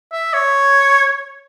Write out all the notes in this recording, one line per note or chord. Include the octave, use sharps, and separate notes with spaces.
E5
C#5